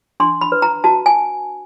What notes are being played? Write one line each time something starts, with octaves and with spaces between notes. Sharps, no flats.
D4 C6
B5
B4
A#5
F#4 A5
G#5